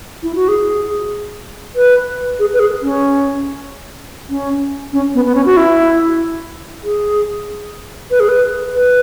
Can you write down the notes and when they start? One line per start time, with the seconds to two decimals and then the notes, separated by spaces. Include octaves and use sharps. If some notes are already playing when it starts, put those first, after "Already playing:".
0.23 E4
0.35 F#4
0.48 G#4
1.75 B4
2.39 G#4
2.54 B4
2.60 G#4
2.82 C#4
4.30 C#4
4.93 C#4
5.14 B3
5.26 B3
5.35 C#4
5.45 F#4
5.57 E4
6.83 G#4
8.11 B4
8.20 G#4
8.29 B4
8.74 B4